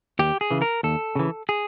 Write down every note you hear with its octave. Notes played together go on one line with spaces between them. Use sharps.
D#2 G4
G#4
C#3 E3
A#4
D#2 A4
C#3 E3
G#4